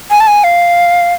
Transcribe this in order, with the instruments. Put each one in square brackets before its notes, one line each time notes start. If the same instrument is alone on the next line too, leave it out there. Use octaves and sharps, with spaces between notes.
[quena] G#5
A5
G#5
F5